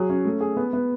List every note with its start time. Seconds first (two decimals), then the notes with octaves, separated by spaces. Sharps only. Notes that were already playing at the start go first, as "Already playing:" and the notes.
Already playing: F#3 G#4
0.10 C#4
0.25 A3
0.41 G#4
0.57 B3
0.73 B3